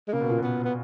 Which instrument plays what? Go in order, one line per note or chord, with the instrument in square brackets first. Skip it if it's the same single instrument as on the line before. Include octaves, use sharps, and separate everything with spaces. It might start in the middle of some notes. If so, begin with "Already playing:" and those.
[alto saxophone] G#3
[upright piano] C#3 [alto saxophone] A#3
[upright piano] B2
A#2
[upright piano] B2 [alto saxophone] B3
[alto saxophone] B3